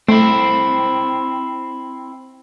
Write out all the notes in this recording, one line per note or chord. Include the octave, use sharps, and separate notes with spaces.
A3 C4 E4